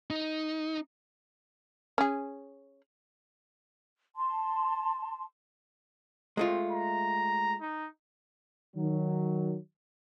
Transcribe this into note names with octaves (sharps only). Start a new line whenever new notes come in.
D#4
C#4 G#4
A5 C6
G#3 A3 C4 F4
A#5
D#4
D#3 F#3